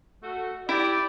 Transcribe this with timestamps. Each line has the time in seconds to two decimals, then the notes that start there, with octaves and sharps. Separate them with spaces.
0.23 A3 F#4
0.69 E4 G4 D5